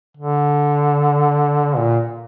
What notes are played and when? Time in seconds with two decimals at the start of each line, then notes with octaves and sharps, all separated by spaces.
0.17 D3
1.77 A#2